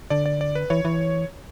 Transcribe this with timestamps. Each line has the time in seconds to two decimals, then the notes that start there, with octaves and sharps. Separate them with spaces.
0.10 D3 D5
0.26 D5
0.41 D5
0.55 B4
0.70 E3 C#5
0.85 E3